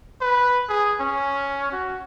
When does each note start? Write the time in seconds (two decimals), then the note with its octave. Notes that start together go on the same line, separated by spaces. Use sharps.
0.21 B4
0.69 G#4
1.00 C#4
1.72 F#4